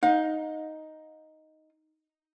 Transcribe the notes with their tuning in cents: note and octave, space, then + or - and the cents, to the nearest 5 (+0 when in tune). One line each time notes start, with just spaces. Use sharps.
D#4 +5 F5 +45